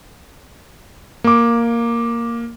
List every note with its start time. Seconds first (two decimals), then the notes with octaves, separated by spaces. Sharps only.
1.24 A#3 D6